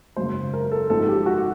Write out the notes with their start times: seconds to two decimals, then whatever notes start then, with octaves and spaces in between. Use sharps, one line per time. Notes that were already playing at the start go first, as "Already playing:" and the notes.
0.16 G#1 F#2 C#3 C5
0.53 A#4
0.71 A4
0.90 G#1 G#2 F3 A4
1.08 G4
1.26 F#4